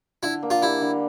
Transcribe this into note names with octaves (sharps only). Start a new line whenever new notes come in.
D3 E4
A#3
F4
G3 E4
D3